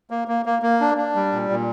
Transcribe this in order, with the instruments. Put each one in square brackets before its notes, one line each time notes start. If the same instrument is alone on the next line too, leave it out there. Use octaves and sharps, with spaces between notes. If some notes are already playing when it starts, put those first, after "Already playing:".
[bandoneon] A#3
A#3
A#3
A#3
D4
D4
G3
A#2
A#2